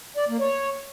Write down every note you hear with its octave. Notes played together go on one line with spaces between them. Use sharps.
D5
A#3
C#5